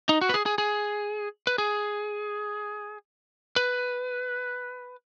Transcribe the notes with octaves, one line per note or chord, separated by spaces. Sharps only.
D#4
F#4
B4
G#4
G#4
G#4
B4
G#4
B4